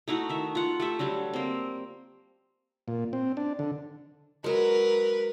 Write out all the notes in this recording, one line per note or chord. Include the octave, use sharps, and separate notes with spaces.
A3 D#4 E4 F#4
D#3 E5
F4 F#5
A3 G4 E5
D3 F#3 G3 E5
A#3 C4
A#2
C4
D4
D3
F#3 G#3 A#4 B4